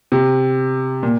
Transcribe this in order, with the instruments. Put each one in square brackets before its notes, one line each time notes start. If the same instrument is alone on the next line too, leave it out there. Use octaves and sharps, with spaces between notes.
[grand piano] C3
A#2